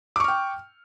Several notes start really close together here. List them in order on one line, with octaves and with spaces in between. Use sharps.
D6 C#6 F6 G5